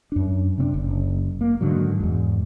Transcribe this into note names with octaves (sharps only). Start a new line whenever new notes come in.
F#2 D4
C3 C4 D4
F#1
A#3
G#2 D3 D#3 F#3
E2 G#2